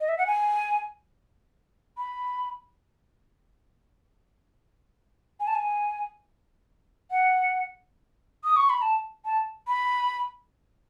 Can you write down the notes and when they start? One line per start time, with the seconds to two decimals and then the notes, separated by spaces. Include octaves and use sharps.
0.01 D#5
0.09 E5
0.18 F#5
0.27 G#5
1.97 B5
5.40 G#5
5.47 A5
5.55 G#5
7.11 F#5
8.44 D#6
8.57 C#6
8.70 B5
8.82 A5
9.25 A5
9.68 B5